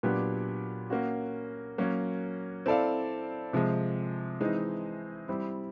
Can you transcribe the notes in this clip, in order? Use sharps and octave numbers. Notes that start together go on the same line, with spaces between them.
A#2 F#3 B3 D4 G4
A#3 C#4 F#4
F#3 A#3 C#4
C4 E4 A4 D5 F5
C3 F3 G#3
E3 G#3 C4 D#4
G3 C4 E4